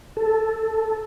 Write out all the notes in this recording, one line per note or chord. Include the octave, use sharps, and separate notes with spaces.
A4